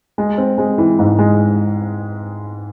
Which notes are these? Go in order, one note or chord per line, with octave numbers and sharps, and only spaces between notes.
G#3
C4
G#3
E3
G#2
G#3